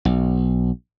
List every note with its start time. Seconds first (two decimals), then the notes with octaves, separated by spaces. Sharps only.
0.05 B1